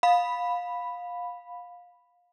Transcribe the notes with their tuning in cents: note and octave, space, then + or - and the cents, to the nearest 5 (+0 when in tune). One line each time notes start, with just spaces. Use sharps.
F5 +20 B5 +0